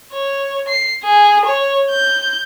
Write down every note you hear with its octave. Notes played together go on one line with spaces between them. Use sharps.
C#5
C7
G#4
C#5
G6